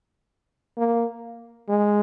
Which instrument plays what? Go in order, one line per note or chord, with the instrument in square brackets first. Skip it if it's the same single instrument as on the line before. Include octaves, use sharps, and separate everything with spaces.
[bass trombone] A#3
G#3